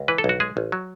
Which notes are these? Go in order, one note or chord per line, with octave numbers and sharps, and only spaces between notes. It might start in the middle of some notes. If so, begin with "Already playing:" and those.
Already playing: C#2
E3 B4
A4
B1
F#4
G#3 G#4
A1
F#3